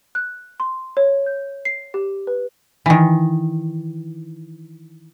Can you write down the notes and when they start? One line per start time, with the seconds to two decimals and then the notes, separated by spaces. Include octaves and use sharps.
0.15 F#6
0.60 C6
0.97 C#5
1.26 G6
1.65 C7
1.94 G4
2.27 B4
2.86 D#3 E3